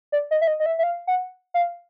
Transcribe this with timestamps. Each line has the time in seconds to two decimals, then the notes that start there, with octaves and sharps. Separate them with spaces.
0.12 D5
0.31 D#5
0.41 E5
0.48 D#5
0.60 D#5
0.66 E5
0.79 E5
0.83 F5
1.07 F#5
1.54 F5